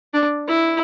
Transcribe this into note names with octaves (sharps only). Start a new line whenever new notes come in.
D4
E4